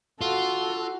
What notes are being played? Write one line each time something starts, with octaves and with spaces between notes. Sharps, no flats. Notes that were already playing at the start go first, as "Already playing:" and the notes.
F4 F#4 A4